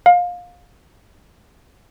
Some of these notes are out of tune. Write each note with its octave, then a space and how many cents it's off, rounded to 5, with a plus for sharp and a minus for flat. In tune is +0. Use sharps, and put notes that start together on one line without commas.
F5 +25